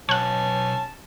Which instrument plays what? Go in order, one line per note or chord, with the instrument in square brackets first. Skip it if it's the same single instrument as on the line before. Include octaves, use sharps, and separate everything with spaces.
[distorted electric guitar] B1 [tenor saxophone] C#4 [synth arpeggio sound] C#5 F#5 [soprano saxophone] A5